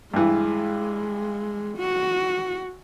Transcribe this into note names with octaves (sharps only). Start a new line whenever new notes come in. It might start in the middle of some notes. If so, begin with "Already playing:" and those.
G2 E3 G#3
F#4